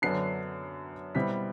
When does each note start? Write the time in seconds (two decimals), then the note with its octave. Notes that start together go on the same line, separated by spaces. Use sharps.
0.02 F#2 D3 F#3 B3 D4 C7
1.15 B2 G3 C4 E4 B6